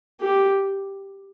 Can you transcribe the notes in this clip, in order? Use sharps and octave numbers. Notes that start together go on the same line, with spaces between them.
G4